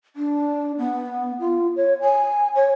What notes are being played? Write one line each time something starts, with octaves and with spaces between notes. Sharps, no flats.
D4
B3
F4
C#5
G#5
C#5